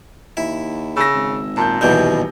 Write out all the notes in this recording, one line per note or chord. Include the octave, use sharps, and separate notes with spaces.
D#2 E4
C#3 E6 A#6
G#1
A#2 A5 G6
D#1 B1 E2 B2 G3 G6